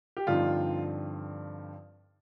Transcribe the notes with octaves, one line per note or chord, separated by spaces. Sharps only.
G4
G2 D3 F3 C4 D#4 F4